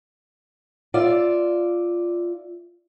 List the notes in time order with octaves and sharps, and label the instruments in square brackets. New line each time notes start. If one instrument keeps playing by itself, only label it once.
[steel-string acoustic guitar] F4 D5 E5